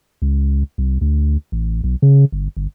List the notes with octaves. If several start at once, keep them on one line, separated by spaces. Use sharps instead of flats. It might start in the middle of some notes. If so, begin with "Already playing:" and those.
C#2
C2
D2
A1
B1
C#3
G1
G1